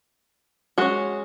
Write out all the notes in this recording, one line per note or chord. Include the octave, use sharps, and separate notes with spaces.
G#3 C#4 F#4